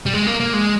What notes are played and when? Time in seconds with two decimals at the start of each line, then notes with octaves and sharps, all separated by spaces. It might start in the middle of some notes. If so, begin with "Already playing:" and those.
0.06 G3
0.14 G#3
0.27 A#3
0.40 A#3
0.53 G#3